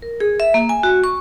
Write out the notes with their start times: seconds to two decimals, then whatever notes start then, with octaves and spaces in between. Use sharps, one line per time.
0.02 A#4
0.20 G#4
0.40 E5
0.54 A#3
0.69 G#5
0.83 F#4
1.04 C#6